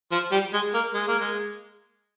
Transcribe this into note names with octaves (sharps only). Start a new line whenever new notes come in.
F3
G3
G#3
A#3
G#3
A#3
G#3